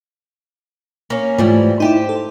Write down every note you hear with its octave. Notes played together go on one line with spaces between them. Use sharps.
A#3 C#4
G#2 E3 F3 G3 A3
D#4 E4 G4 C5
A4